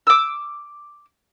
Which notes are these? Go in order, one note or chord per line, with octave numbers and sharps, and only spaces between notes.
D6 E6